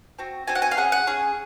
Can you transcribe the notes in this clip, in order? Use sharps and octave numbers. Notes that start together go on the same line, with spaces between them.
C4 F#4
C4 F#4 G#5
F#5
G#5
F5
C#4 G#4 F#5
F#5
C#4 G#4